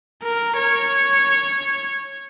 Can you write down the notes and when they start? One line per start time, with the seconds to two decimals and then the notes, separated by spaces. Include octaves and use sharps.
0.23 A#4
0.57 C#5